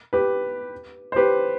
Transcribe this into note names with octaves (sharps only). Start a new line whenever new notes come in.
G4 B4
C5
G4 B4